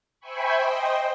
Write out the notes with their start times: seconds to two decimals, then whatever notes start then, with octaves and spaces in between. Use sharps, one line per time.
0.20 C5 E5 G5 G#5 B5 C#6
0.55 C5 D#5 G5